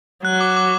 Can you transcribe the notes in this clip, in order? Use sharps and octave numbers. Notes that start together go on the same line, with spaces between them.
F#3 F#6
D6
D6